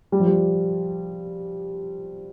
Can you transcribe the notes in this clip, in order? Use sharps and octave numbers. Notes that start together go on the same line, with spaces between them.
G3
F3
G3